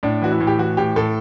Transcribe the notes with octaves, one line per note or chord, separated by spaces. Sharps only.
A2 D4
E3 F#4
E4
A2
G4
E3 F#4
A2 G4
A2 A4